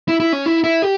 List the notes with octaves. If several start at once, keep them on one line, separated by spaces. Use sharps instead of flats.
E4
E4
C#4
E4
E4
G4